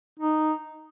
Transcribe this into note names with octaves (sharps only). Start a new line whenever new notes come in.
D#4